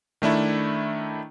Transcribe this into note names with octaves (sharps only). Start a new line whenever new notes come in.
D#3 A3 D4 E4